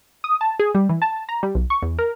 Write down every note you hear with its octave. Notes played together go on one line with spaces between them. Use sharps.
D#6
A5
G#4
G3
E3
A5
A#5
G3
B1
C#6
E2
A#4